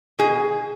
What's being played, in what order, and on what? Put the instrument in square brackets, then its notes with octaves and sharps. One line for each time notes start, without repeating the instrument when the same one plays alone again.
[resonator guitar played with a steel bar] B2 G#4